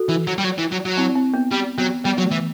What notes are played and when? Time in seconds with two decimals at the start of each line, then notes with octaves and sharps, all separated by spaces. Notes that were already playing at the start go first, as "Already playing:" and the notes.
Already playing: F#4 A4
0.09 E3
0.27 F#3
0.38 G3
0.44 F#3
0.58 E3
0.72 F#3
0.85 F#3
0.97 C4 E4
1.16 C4
1.34 B3
1.51 G3
1.78 F#3 B3
2.04 G3 B3
2.18 F#3
2.22 A3
2.31 E3